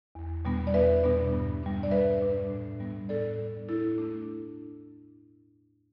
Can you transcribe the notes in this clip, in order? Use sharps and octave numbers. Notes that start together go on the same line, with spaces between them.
E2
B2 G3 B3 D4
D5
E2 B4 E5
B2 G3 B3 D4
G2
G3 D4
D5
G2 B4 E5
G3 D4
A2
G3 B3 D4
A2 A4 D5
G3 B3 D4
A2 E4 A4
A3 D4